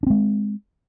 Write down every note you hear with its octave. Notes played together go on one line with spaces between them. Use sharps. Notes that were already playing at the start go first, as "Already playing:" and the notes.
G#3 C4 D4